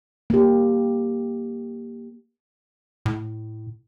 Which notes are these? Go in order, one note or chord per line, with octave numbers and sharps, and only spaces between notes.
A#3 G4
A2